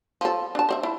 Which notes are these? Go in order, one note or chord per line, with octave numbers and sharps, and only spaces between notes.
F3 A4
D4 A5
C5 D5 E5
E4